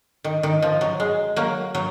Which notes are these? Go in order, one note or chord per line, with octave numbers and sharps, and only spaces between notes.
D#3
D#3
F3
F#3
G#3
F#3 A#3
F#3